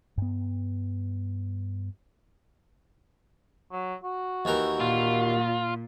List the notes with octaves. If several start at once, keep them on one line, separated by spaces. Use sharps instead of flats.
G2 B3
F#3
F#4
D#2 E3 A#4
A#2 F4